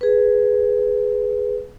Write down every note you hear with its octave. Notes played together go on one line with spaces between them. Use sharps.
G#4 B4